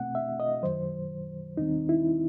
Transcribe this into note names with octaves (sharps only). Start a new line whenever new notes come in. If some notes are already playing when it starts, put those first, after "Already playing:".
Already playing: B2 A3 C4 F#5
E5
D#5
F#2 D#3 F#3 C5
D#2 D#3 G3 C4 D#4
E4